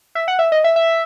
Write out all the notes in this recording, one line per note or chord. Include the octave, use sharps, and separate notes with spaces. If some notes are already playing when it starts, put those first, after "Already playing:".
E5
F#5
E5
D#5
E5
E5